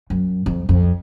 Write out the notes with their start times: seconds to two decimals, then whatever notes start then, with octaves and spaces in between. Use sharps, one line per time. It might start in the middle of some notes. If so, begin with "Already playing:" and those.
0.10 F#2
0.46 F2
0.69 F2